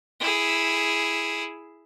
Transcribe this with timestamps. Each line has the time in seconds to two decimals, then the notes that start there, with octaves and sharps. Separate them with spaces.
0.20 E4 G#4